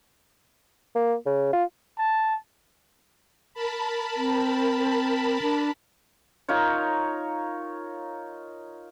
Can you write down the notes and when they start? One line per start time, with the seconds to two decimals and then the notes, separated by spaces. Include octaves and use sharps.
0.95 A#3
1.26 C#3
1.53 F4
1.98 A5
3.54 A#4 A5 B5
4.17 C4
5.42 D4
6.49 D#4 F4 A#4 C#5